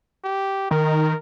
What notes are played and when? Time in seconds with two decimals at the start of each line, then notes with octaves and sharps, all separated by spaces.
0.24 G4
0.71 D#3 A#4